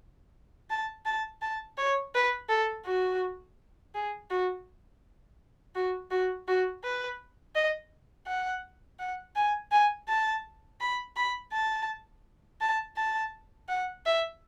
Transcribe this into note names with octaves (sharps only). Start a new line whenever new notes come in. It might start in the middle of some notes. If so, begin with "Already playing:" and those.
A5
A5
A5
C#5
B4
A4
F#4
G#4
F#4
F#4
F#4
F#4
B4
D#5
F#5
F#5
G#5
G#5
A5
B5
B5
A5
A5
A5
F#5
E5